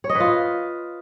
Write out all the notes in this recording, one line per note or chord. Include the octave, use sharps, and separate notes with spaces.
C#5
D#5
B4
F4